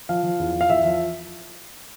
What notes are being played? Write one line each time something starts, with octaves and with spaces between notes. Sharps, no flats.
F3 F5
F3
E2
F3
F5
E2 E5
F3